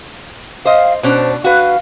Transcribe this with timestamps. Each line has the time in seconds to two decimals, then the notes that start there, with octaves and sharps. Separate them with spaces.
0.65 C5 D#5 F5
1.03 B2 C#4 D4 C5
1.44 F#4 B4 F5